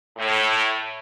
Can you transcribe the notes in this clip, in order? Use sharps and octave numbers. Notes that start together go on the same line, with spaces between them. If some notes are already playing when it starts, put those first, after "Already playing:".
A2